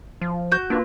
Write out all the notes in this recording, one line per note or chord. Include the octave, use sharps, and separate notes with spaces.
F3
F#4 G6
A#3 D4 F4 B4